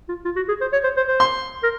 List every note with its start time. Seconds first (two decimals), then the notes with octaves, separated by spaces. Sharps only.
0.09 F4
0.25 F4
0.36 F#4
0.48 G#4
0.61 C5
0.73 C#5
0.84 C5
0.97 C5
1.08 C5
1.20 C6
1.63 A#4